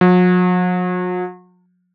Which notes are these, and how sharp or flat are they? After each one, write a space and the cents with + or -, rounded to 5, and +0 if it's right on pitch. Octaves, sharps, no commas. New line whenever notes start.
F#3 -45